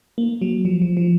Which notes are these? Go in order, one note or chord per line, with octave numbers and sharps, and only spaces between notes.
A#3
F#3
F3
F3
F3